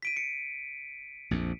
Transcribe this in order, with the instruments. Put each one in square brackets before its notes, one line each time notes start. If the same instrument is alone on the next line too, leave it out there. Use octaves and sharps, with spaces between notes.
[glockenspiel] B6 D7 D#7
C#7
[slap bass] A#1 F2